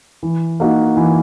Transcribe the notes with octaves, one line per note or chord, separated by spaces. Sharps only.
E3
A#3 D#4 F#4
E3